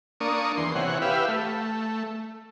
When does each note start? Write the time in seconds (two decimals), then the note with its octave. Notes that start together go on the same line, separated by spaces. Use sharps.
0.21 A#3 D4 C#6 D#6
0.57 E2 C6
0.75 C3 E3 C#5 F#5
1.02 G4 B4 E5 F5
1.28 A3